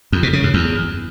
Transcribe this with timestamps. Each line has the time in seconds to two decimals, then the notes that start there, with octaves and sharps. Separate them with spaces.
0.12 F2
0.23 B2
0.33 C#3
0.43 F#2
0.54 E2